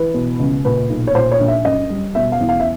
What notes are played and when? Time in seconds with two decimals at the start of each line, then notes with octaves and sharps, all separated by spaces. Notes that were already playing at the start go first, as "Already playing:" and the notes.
Already playing: E3 B4
0.14 B2
0.39 C#2
0.64 A#2 B4
0.90 B1
1.07 C#5
1.15 A#2 C5
1.32 C#5
1.40 A#1
1.48 E5
1.65 F#2 D#5
1.90 G3
2.15 B2 E5
2.32 F5
2.40 E2
2.49 F5
2.60 E5